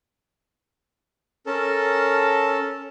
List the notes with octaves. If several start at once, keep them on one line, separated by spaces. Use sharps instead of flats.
C#4 A4 A#4 A5